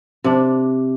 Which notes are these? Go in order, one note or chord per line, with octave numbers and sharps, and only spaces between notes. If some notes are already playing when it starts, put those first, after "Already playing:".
C3 D4